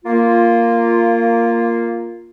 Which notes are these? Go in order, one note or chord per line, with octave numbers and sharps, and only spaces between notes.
A#3 F4